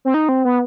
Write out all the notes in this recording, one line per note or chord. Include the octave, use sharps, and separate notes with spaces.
C4
D#4
C4
B3